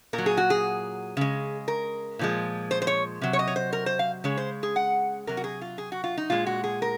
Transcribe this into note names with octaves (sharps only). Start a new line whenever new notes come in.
A#2 A#4
F#3
G#4
F#4
G#4
C#3 G#3
A#4
A#2 F3 G#3
C5
C5
C#5
C3 F#3
C#5
D#5
C#5
C5
A#4
C5
F5
C#3 G#3 C#5
C5
G#4
F#5
C3 F#3 A#4
F#4
G#4
F4
G#4
F#4
F4
D#4
A#2 G#3 F4
F#4
G#4
A#4